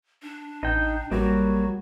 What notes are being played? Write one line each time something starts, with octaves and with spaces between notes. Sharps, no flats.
D4
A1 D#4 G5
A1 F#3 G3 A#3 F#4